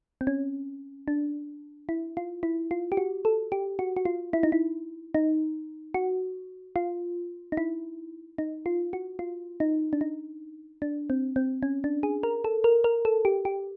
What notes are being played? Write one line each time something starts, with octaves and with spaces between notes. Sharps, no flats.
C4
C#4
D4
E4
F4
E4
F4
G4
F#4
A4
G4
F#4
F#4
F4
E4
D#4
E4
D#4
F#4
F4
D#4
E4
D#4
F4
F#4
F4
D#4
D4
D#4
D4
C4
C4
C#4
D4
G#4
A#4
A4
A#4
A#4
A4
G4
G4